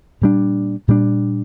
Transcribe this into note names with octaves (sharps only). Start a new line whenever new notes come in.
A#2 G3 D4
A#2 G3 D4